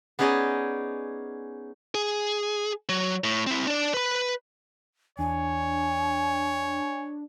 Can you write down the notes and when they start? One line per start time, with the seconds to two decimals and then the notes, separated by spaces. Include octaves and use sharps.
0.19 B3 C#4 D#4 G#4 D5 D#5
1.95 G#4
2.89 F#3
3.24 A2
3.47 C4 E4
3.67 D4 D5
3.94 B4 B5
5.19 E2 D4 C#5 G#5